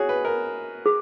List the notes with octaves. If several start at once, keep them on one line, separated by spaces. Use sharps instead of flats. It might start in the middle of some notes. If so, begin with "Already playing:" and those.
Already playing: F#4 G#4 C#5
B4
A#4
G#4